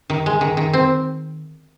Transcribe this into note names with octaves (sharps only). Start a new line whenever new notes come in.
D#3
G#3
D#3
D#3
C4